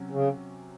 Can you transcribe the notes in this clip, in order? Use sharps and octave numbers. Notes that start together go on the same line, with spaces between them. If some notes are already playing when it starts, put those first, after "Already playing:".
Already playing: C3 F#3 C#4
C#3